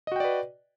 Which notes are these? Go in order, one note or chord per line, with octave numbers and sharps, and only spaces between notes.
F#4 B4 D5 D#5 G5